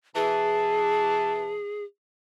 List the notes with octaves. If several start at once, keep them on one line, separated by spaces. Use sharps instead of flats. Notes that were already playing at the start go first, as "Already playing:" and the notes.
B2 E3 G#4 A5